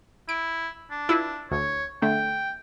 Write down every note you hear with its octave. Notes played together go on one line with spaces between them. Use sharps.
E4 D7
D4
E4 F4 B4
D2 C#5
D3 A3 G5